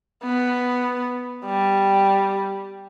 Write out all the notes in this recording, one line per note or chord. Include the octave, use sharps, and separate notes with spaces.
B3
G3